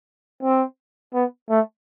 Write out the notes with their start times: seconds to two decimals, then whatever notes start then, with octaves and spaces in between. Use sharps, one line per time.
0.43 C4
1.14 B3
1.50 A3